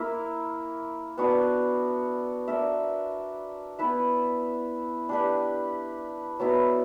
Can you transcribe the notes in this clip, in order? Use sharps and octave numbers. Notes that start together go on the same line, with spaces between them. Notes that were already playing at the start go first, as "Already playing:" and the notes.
Already playing: A#3 E4 A#4 E5
B3 D4 F#4
D4 A#4 E5
B3 E4 B4 E5
D4 G4 B4
F#3 B3 E4